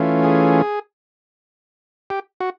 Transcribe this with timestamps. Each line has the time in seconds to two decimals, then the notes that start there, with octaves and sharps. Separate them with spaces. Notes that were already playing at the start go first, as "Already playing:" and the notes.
Already playing: E3 A3 C#4 F4
0.24 G#4
2.10 G4
2.40 F#4